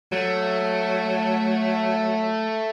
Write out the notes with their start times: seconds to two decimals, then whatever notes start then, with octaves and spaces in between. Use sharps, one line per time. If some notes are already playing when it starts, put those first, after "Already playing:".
0.12 F#3 A3